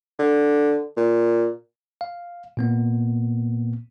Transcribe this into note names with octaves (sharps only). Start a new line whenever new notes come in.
D3
A#2
F5
A#2 A#3 B3